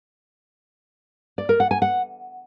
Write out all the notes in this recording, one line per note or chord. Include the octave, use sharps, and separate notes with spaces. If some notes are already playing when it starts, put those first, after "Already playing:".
D5
A#4
F#5
G#5
F#5